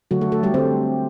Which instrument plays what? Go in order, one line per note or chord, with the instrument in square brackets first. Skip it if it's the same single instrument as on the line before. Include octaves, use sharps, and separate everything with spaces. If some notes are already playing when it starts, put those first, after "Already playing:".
[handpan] D3 F#3 A3 F#4
A3 A4
A3 A4
G3 G4
D3 A3 C4 C5